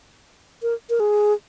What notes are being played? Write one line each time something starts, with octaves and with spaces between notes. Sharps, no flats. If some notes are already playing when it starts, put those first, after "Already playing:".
A#4
A#4
G#4